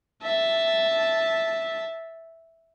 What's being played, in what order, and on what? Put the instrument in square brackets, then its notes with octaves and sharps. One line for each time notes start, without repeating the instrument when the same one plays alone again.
[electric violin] E5 A5